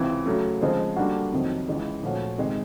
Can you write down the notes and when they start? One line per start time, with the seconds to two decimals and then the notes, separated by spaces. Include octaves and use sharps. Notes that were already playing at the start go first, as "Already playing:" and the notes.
Already playing: C#2 C3 E3
0.26 C#3 F#3 A3
0.61 C#3 F3 G#3 C4
0.96 D3 G3 A#3 D4 F#4
1.32 F2 C3 D#3 F#3
1.67 C#2 C#3 E3 G#3 B3
2.02 A#2 F3 A3 C#4 F#4
2.38 C3 D#3 G#3